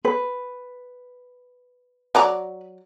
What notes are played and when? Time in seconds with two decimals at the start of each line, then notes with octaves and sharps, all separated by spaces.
0.05 B4
2.15 F#3 D5 A#5